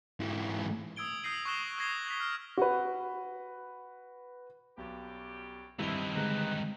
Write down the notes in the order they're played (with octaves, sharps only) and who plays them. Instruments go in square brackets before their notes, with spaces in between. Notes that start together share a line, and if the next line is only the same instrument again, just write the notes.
[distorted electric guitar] G#2 E3
[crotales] D#6 E6 G#6 D7 G7
D#6 G6 A#6 C7 D#7 F#7
C#6 D#6 F#6 A#6 E7 G7
D#6 F#6 G#6 A#6 C7 G7
G#6 B6 G7
F6 G7
[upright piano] F#4 B4
[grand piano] B1 [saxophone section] F#2 G3 G4
[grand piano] G2 C4 G7 [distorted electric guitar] D#3 E3 [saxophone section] E4
[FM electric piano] D3 G#3 [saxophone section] D#4 B4